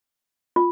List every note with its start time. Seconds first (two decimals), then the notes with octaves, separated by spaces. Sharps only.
0.56 F4